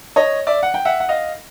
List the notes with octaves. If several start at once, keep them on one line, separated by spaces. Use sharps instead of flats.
C#5 D#5
D5 E5
F#5
G5
E5 F#5
F#5
D#5 F5